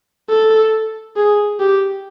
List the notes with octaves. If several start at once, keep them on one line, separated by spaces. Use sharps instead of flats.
A4
G#4
G4